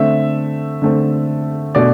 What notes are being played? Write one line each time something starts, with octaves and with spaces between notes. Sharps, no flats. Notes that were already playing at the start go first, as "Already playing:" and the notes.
Already playing: D3 A3 C4 E5
D3 A3 C4
B2 A3 D4 D5